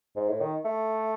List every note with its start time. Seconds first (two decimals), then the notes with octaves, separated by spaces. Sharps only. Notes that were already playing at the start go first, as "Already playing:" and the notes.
0.16 G#2
0.29 A2
0.41 D#3
0.65 A3